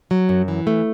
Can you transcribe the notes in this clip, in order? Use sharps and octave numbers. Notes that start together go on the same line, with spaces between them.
F#3
F#2
E3
A3